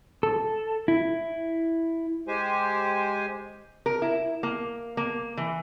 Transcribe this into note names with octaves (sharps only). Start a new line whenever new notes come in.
A4
E4
G#3 G4 C5 G#5
A#4
E4
A#3
A#3
E3